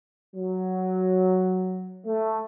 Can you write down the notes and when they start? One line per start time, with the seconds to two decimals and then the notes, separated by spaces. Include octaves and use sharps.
0.36 F#3
2.06 A3